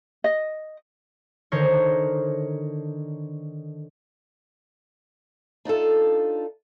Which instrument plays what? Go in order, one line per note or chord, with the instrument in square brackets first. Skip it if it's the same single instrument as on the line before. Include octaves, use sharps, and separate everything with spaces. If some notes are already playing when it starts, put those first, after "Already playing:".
[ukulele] D#5
[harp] D3 D#3 A#4 C5 C#5
[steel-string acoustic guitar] D4 D#4 F4 A4